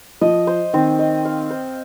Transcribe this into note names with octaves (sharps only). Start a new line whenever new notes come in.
F3 D#5
C5
D#3 C4
D#5
F5
C5